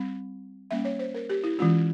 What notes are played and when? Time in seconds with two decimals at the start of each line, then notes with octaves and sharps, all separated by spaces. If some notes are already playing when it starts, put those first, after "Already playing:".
Already playing: G3 C4
0.71 G3 A#3 C#4 E5
0.85 C#5
0.99 C5
1.14 A#4
1.30 G4
1.44 E4
1.59 E3 G#3 C#4 F4